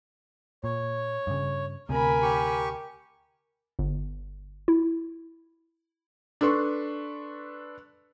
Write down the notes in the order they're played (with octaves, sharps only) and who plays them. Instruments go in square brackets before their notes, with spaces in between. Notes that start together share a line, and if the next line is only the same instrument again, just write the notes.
[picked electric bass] A#2 [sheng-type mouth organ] C#5
[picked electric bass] G2 C#3
[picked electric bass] D2 C3 [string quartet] A#4 G#5 B5
[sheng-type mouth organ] G4 C#6
[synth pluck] G1
E4
[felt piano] D4 A4 B4 C6 C#6